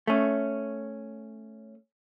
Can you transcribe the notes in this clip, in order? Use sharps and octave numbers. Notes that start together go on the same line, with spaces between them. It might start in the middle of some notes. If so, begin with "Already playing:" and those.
A3 C#4